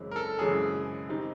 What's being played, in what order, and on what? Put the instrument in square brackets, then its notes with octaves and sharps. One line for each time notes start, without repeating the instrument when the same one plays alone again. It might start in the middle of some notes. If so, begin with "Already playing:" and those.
Already playing: [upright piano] F#2 C#3 E3 G#3 C4
[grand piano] A#4
A4
[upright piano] F#2 C#3 E3 G#3 C4 [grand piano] G#4
[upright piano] D#3 G3 C4 D#4